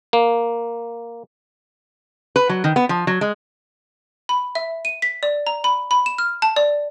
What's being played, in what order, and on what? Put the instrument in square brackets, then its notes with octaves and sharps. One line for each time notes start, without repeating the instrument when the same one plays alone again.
[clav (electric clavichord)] A#3
[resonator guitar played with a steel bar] B4
F#3
D#3
B3
F3
F#3
G#3
[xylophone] B5
E5
D#7
B6
D5
A#5
B5
B5
E7
F6
A5
D5